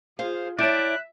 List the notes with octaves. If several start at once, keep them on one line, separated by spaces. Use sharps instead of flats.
F4 G#4 C5 F5
E4 C#5 D5 E5 G5 A5 F#6